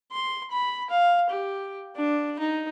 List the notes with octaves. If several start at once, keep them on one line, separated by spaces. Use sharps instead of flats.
C6
B5
F5
G4
D4
D#4